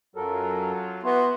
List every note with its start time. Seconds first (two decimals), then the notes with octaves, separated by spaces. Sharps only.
0.16 F#2 F#3 F4 A4 A#4
1.03 B3 E4 F#4 C6